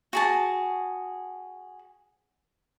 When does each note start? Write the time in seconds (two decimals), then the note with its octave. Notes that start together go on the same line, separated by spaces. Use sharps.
0.13 F#4 G#4 A5